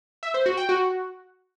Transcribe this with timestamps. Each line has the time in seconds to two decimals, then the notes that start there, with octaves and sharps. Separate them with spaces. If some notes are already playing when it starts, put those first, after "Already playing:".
0.23 E5
0.34 C5
0.46 F#4
0.57 G5
0.69 F#4